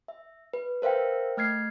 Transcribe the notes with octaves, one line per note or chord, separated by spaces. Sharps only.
E5
B4
A#4 C5 E5 F5 G5
A3 F6 G#6 C7